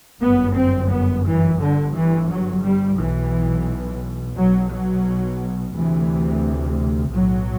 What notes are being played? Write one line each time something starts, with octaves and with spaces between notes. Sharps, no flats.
G1 F#2 B3
C4
B3
E3
G1 G2 D3
E3
F#3
G3
B1 B2 E3
B1 B2 F#3
F#3
D2 C3 E3
B1 A2 F#3